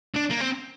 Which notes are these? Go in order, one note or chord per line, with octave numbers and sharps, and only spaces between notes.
D4
A#3
C4